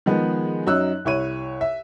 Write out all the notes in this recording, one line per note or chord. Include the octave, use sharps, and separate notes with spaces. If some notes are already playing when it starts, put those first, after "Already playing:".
D#3 F3 G#3 B3
F#2 F#3 D#4 E6 F#6
C2 E4 C#5 D#7
E5